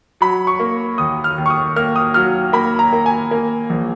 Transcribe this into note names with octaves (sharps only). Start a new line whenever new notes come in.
F#3 B5
C#6
A#3
D#2 D#6
F6
D#2
C#6
D#6
A#3 F6
D#6
F#3 F6
A#3 B5
A#5
A#3
G#5
A#3
A#1